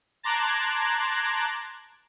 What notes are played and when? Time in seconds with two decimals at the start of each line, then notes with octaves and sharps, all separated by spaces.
0.23 A5 A#5 C6 D6 F#6 G#6